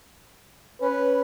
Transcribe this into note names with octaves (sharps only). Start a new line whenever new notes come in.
C#4 B4